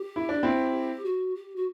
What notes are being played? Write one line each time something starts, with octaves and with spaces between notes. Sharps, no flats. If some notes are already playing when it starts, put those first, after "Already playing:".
Already playing: G4
E4
D4
C4 E4
F#4
G4
F#4